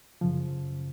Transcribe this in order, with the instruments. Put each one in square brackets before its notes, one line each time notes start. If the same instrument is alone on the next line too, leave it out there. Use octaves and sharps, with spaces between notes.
[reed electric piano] F#2 C#3 F3